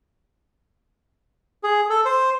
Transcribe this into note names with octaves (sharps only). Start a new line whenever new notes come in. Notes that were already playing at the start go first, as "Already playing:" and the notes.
G#4
A4
C5